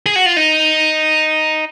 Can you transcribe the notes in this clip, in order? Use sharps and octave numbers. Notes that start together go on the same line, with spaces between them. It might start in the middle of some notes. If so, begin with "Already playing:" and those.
G#4
F#4
F4
D#4